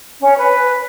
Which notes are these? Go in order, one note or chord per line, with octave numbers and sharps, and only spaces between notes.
C#4
B4